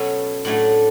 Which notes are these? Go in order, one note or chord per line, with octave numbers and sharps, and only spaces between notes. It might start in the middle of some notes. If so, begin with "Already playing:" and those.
Already playing: B2 F#3 C#4 A4 B4
A2 F#3 A3 D4